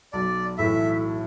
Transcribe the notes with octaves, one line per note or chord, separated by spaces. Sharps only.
B1 D5
A2 E3 A3 E5